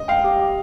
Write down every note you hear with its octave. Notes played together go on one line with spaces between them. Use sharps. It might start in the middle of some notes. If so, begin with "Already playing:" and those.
Already playing: D#5
F5 G5
G4
G4